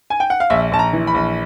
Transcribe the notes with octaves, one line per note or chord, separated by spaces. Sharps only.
G#5
G5
F#5
F5
A#1 E5
A#1 A5
A#5
E3
B5
A#1